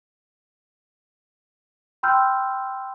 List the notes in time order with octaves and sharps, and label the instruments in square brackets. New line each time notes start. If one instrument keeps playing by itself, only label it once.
[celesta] G5 B5 C6 E6 F6 G6